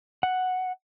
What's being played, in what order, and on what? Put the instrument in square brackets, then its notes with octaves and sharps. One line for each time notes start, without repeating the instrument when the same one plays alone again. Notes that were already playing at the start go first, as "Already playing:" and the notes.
[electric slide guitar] F#5